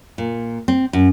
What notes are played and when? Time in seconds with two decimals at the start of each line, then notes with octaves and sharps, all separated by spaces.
0.18 A#2
0.68 C4
0.93 F#2